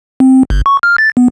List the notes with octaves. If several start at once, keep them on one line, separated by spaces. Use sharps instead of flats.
C4
G1
C#6
F6
A6
B3